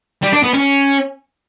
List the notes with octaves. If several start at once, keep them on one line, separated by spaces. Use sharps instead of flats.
G3
D4
B3
C#4